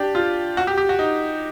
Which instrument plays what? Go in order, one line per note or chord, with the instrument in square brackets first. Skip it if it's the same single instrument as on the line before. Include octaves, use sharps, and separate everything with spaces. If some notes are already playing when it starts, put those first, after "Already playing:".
Already playing: [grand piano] D4 G4
F4
F#4
G4
G4
F#4
D#4